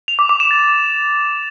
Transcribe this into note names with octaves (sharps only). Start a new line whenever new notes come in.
F7
D6
D6
E7
A6